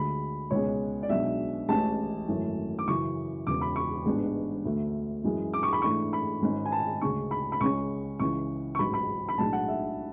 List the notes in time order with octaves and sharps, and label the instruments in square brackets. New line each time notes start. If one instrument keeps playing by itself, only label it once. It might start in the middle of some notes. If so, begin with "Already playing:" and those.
Already playing: [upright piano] D2 D3 G#3 B5
C#2 B2 G#3 C#5
D5
B1 B2 G#3 D4 E5
A1 A2 G#3 C#4 A5
G#1 F#2 E3 A3 C#4
D6
F#2 C#3 E3 C#6
E1 E2 C#3 D6
B5
C#6
A1 G#2 G#3 B3 D4
D2 D3 A3
F#2 E3 G#3
D6
C#6
B5
G#2 E3 A3 D4 C#6
B5
G#1 G#2 G#3 C#4
G#5
A5
D2 C#3 G#3 C#4 C#6
B5
B5
C#2 C#3 G#3 C#4 C#6
C#2 C#3 E3 C#6
C#6
A1 G#2 F#3 B5
B5
B5
B1 A2 G#3 D4 A5
F#5
E5